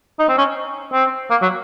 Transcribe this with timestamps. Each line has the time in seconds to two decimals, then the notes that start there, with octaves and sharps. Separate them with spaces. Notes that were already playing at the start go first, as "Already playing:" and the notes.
0.19 D#4
0.29 C4
0.38 C#4
0.93 C4
1.30 A#3
1.42 F#3